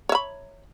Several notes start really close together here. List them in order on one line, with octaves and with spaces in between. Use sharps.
C#5 E5 B5